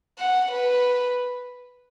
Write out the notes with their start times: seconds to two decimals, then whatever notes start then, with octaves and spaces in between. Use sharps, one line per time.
0.19 F#5
0.51 B4